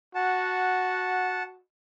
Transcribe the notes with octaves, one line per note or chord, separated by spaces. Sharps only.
F#4 F#5 A5